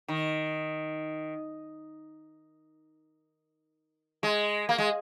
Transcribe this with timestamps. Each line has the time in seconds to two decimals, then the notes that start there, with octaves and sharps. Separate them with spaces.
0.08 D#3
4.23 G#3
4.69 A#3
4.78 G#3